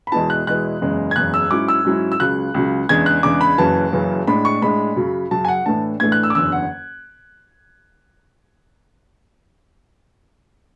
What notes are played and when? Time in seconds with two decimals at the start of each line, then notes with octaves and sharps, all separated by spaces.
0.07 B5
0.12 E2 B2 G#3 B3 E4 A5
0.30 F#6
0.47 E2 B2 G#3 B3 E4 F#6
0.81 F#1 E2 C#3 G#3
1.11 G#6
1.16 F#1 E2 C#3 G#3 F#6
1.34 E6
1.50 G#2 F#3 C#4 E4 D6
1.68 E6
1.85 G#2 F#3 C#4 E4
2.12 E6
2.20 C#2 C#3 F#3 F#6
2.54 C#2 C#3 F#3
2.89 E2 C#3 G#3 D4 G#6
3.06 F#6
3.23 E2 C#3 G#3 D4 D6
3.41 B5
3.58 F#1 F#2 C#3 E3 A5
3.93 F#1 F#2 C#3 E3
4.27 A2 G#3 D4 B5
4.45 C#6
4.62 A2 G#3 D4 B5
4.96 F#2 C#3 F#3
5.31 F#2 C#3 F#3 A5
5.45 G#5
5.48 F#5
5.66 A2 E3 A3 D4 A5
6.00 A2 E3 A3 D4 G#6
6.12 F#6
6.23 E6
6.30 D6
6.35 F#1 E2 D3 E6
6.52 F#5